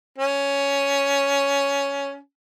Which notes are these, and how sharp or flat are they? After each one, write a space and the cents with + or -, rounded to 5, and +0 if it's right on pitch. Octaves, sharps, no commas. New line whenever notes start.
C#4 +10